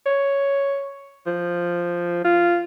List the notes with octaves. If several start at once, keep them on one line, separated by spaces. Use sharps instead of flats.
C#5
F3
F4